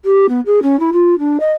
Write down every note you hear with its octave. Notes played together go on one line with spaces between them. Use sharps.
G4
B3
G#4
C#4
E4
F4
D4
D#5